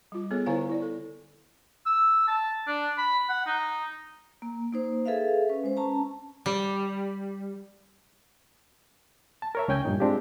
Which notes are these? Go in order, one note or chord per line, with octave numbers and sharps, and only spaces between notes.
G3 F4
B3 G#4 A4 C#5
D3 E4 C5 C#5 F5 G#5
E4 D5
A4
E6
A5
D4
B5
F#5
D#4
A#3
A#3 D#4 C5
G#4 A4 B4 E5 F5
C#4 B4
G#3 C5
C#4 A5 A#5
G3
A5
A#4 C#5 E5
C#2 C#4 G5 G#5 G6
G2 A#2 D#4
G#3 C4 D4 F4 G4